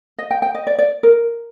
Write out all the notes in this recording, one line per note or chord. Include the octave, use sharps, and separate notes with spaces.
D#5
G5
G5
D#5
D5
D5
A#4